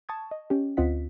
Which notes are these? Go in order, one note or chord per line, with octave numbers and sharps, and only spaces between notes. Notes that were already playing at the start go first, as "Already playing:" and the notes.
A5 C#6 D#6 G#6
D#5
C#4 G4
D2 C4 F4 D#5 F#5 B6